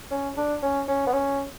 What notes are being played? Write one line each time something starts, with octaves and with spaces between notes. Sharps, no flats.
C#4
D4
C#4
C#4
B3
C#4